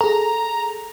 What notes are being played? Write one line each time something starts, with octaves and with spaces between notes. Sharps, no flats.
G#4 A4 A#5